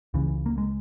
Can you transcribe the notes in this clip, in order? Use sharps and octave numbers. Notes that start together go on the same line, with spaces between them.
C#2 C#3 E3
A#3
G#3